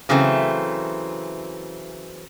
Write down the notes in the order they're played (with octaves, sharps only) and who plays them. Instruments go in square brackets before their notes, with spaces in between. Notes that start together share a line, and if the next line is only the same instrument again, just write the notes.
[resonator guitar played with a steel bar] C#3 E3 F#3 A3 C4